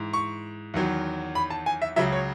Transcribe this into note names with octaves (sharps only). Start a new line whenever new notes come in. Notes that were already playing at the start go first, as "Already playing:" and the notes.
Already playing: G#2 E3
C#6
E2 D#3 F#3
B5
A5
G#5
E5
C#2 C#3 F#3 E5
C#5